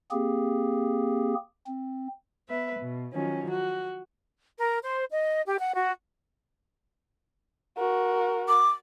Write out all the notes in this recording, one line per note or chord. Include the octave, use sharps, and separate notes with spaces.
A#3 C4 G4 G#4
C4
B3 B4 E5
B2
D#3 F3 F#3 C#4
F#4
A#4
C5
D#5
G4
F#5
F#4
F#4 A#4
D6